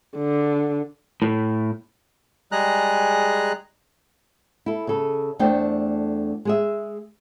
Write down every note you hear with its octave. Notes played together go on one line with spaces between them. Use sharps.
D3
A2
G3 G#3 G#4 A#5 F#6
E4 A4
C#3 A4
E2 A3 D4 A4 C5 G5
G#3 G#4 E5